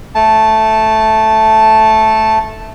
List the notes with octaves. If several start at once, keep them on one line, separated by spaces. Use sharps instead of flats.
A3 A5